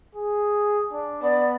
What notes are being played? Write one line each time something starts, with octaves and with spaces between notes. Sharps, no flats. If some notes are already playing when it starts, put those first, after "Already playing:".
G#4
D4
B3 D5